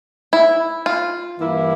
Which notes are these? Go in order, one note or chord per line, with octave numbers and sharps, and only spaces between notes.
E4
F4
G2 E3 A#3 E4